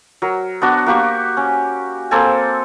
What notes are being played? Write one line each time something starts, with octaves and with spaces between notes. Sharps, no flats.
F#3 A#4
B3 D4 F#4
A#3 F#4 G4 C#6
C#4
A#3 C4 A4 G#5